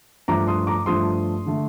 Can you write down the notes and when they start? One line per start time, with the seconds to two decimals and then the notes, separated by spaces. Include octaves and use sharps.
0.28 G2 F3 A3 A#5 D6
0.47 C6 D#6
0.67 A#5 D6
0.86 G2 F3 A3 C6 D#6
1.46 D3 A3